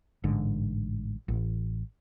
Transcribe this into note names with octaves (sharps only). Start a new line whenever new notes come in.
A1 G#2 D3
A1